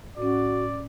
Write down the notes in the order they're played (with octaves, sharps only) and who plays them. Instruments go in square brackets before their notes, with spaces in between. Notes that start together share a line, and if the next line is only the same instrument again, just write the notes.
[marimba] A2 C#4 [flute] F#4 [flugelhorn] D5